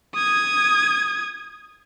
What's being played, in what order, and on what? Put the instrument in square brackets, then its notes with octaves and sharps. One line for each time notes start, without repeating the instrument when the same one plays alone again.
[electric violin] D#6 G#6